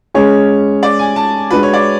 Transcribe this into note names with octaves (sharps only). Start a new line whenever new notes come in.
G#3 C#4 G#4 C#5
D5
G#5
A5
G#3 D4 F#4 B4
C#5
D5